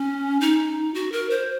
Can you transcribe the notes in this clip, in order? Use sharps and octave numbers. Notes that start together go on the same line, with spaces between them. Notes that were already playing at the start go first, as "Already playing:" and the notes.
Already playing: C#4
D#4
F#4
A#4
C5